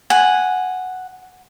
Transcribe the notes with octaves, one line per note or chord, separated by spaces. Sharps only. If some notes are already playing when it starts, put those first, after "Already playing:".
F#5 G#5